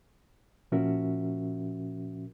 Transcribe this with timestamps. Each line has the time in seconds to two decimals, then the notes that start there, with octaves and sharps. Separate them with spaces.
0.72 A#2 F3 C#4 F#4 A#4 E5